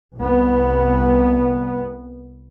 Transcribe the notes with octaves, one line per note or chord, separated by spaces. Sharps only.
C2 B3